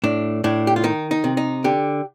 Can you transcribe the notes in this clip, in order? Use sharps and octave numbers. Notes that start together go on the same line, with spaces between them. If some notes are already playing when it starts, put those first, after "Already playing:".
A2 D4
A2 D4
G4
F4
D#3 D#4
D#4
C3
D#4
D3 G4